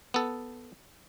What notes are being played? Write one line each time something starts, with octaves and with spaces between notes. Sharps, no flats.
B3 A4